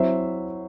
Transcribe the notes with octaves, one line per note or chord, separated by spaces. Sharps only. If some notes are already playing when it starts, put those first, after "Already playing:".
Already playing: F#3 C4 E4 C5 E5